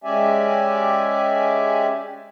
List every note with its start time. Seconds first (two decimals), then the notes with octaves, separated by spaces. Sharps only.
0.04 G#3 C#4 G4 D5 E5 G#5